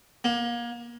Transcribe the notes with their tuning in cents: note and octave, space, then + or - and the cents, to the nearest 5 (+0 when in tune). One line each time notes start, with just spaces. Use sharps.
A#3 +30